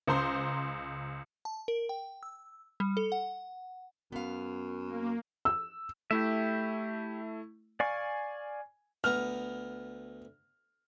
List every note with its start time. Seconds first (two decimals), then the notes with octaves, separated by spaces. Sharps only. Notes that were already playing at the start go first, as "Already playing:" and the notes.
0.07 C#2 C5 A#5 C6
1.45 A5
1.68 A#4
1.89 G5
2.23 E6
2.80 G3
2.97 A4
3.12 F#5
4.12 F#2 B3 F5
4.86 A#3
5.45 E6
6.11 A3 E4 G4 E5
7.80 D5 F5 G#5 C#6
9.04 D2 B3 A#5 F6